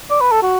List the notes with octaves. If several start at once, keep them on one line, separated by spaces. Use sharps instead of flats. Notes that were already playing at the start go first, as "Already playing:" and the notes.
D5
B4
A4
F#4